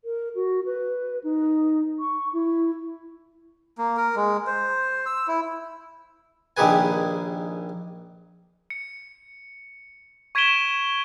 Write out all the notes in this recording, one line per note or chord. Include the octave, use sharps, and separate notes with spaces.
A#4
F#4
B4
D#4
C#6
E4
A#3
A#4
G#3
C5
E6
E4
A#1 D#3 G4 G#4 B4 G#5
C#7
C#6 G#6 B6 D7 E7 G7